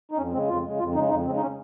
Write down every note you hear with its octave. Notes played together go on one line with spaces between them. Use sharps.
D#4
F2 C#4
C#3 G#3 C4
F2 F4
C#3 G#3
F2 F4
C#3 G#3 D#4
F2 D#4
C#3 C4
G#3
D#4
C#4